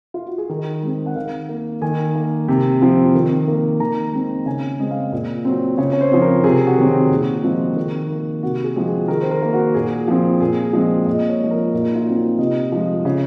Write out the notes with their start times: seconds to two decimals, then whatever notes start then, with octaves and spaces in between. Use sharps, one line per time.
0.14 F4
0.27 F#4
0.38 G#4
0.49 D#3 A#4
0.83 G#3 C4
1.06 F#5
1.16 D#3 F5
1.49 A#3
1.81 D#3 G#5
2.15 A#3
2.48 C3
2.81 F3 C4
3.15 D#3
3.48 A#3
3.80 D#3 A#5
4.13 G#3 C4
4.46 C#3 G#5
4.80 G#3 C4
4.91 F5
5.12 A#2
5.45 F#3 C4
5.78 C#3 C#5
5.93 C#5
6.01 C5
6.12 F3 C4
6.22 A#4
6.44 C3 G#4
6.67 F#4
6.78 D#3 F#3 C4
6.89 F#4
7.11 A#2
7.44 F3 G#3 C4
7.76 D#3
8.10 A#3
8.43 C3 F#4
8.64 G#4
8.76 F3 G#3 C4
8.87 G#4
9.08 D#3 A#4
9.21 C5
9.31 A#4
9.42 A#3
9.53 F#4
9.74 A#2 G#4
10.08 F3 C4
10.40 A#2 G#4
10.73 F3 G#3 C4
11.06 A#2 D#5
11.29 C#5
11.40 F3 G#3
11.51 A#4
11.73 A#2 D#4
11.95 F4
12.06 F#3 C4
12.17 F#4
12.39 C3 D#5
12.72 F3 G#3
13.05 C#3